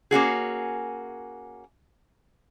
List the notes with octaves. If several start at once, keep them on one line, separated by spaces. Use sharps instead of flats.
A#3 C#4 F#4 G#4